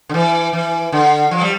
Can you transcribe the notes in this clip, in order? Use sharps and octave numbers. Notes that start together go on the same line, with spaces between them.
D3
E3
E3
D3
F3
G3